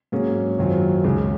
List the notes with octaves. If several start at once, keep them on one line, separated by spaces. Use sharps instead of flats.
G#2 F#3 A#3 C#4 G#4
F#2 D#3 F#3 C4 F4
C#2 C#3 G#3